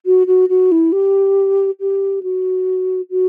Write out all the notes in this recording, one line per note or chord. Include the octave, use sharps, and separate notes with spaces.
F#4
F#4
F#4
E4
G4
G4
F#4
F#4